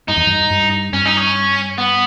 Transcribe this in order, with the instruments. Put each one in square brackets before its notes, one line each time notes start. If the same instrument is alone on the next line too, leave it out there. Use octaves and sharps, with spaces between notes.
[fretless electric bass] G2 [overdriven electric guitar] D#4
[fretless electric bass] E2
G2
G2
[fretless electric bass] G2 [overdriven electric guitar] C#4
[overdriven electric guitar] D#4
C#4
B3